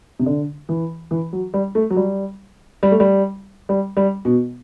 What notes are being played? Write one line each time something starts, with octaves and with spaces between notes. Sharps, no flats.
C3
D3
E3
E3
F#3
G3
A3
F#3
G3
G3
A3
G3
G3
G3
B2